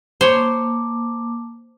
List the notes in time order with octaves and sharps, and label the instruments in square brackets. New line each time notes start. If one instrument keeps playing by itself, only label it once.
[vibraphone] A#3 A5 D6 [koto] C5 C#5